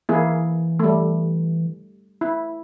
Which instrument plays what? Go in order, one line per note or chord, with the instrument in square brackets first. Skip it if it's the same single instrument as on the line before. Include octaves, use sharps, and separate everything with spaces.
[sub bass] E3 [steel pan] A#3 E4 G#4
[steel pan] G3 A3
E4